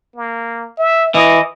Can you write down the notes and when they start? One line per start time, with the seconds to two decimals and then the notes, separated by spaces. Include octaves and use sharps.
0.16 A#3
0.79 E5
1.15 E3 D#5